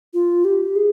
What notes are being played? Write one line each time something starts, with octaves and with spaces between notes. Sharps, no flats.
F4
G4
G#4